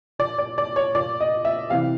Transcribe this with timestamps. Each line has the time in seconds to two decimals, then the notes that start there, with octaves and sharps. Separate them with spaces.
0.19 A#2 D5
0.38 D5
0.58 D5
0.76 C#5
0.95 A#2 D5
1.20 D#5
1.45 E5
1.70 C3 E3 F5